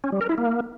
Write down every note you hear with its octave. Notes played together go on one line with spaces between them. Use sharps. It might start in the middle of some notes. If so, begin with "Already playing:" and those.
C#4
G3
A#4
E4
A#3